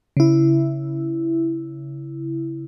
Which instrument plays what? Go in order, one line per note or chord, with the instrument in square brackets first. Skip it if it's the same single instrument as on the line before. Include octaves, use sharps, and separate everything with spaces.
[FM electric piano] C#3 E4